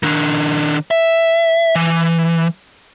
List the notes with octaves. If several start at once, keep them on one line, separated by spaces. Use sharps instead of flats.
D#3 D4
E5
E3